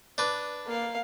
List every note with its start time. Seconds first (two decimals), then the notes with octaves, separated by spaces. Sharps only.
0.18 D4 B4
0.67 A#3 F5